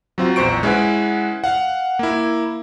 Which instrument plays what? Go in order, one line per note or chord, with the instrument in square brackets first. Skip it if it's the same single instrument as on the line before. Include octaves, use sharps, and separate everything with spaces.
[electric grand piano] F#3 C4 F4
A#1 E2 C5 C#6 D7
G#3 C#4 E4 B4 F#5
F5 F#5
A#3 E4